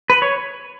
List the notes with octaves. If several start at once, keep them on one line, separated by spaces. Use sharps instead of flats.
B4
C#5